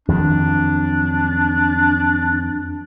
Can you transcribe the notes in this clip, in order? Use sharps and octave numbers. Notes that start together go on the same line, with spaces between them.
F2 D#3 F#3 D4